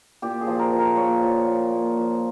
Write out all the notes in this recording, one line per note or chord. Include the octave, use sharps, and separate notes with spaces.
A#2 G4
G#4
F3
A#4
F3
A#4
A#2 C#5
F3
A#2
A#2
F3